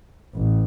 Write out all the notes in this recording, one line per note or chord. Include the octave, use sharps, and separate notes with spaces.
A1